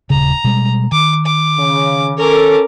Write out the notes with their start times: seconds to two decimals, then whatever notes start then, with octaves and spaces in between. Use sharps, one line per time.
0.10 D#1 C#3 A#5
0.44 B2 G3 G#3
0.92 D#3 D6
1.26 D6
1.58 C#3
2.18 C#4 A4 A#4 D6